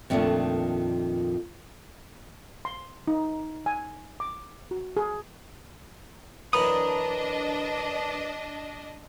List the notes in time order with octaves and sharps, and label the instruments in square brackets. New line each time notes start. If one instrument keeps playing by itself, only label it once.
[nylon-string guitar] F2 A#2 D#3 G#3 A3 D4
[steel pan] C6
D#4
G#5
D6
F#4
G#4
[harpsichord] F#2 E3 [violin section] D4 D#5 [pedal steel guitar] A#5 B5 D#6